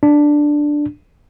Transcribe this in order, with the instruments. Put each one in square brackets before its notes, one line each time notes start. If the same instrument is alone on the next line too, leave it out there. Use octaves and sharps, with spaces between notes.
[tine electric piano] D4